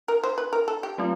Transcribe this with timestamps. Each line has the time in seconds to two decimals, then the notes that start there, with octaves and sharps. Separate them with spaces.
0.08 A#4
0.24 C5
0.38 B4
0.53 A#4
0.68 A4
0.83 G4
0.98 F#3 A3 C4 F4